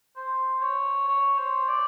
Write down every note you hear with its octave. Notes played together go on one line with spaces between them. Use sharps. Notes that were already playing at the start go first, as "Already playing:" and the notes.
C5
C#5
C#5
C5
D5